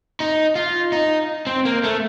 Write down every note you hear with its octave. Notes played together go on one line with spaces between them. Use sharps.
D#4
F4
D#4
C4
A#3
A3